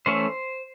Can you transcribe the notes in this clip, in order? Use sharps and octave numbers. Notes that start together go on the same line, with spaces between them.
E3 A3 C#4 C5